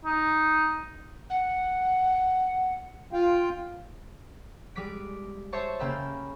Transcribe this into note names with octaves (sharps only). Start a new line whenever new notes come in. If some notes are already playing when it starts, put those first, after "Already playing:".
D#4
F#5
F4 F5 G5
G3 G#3 D6 B6 D7
C5 C#5 E5 A5 C#6
C#3 A#3 G5 B5 E6 E7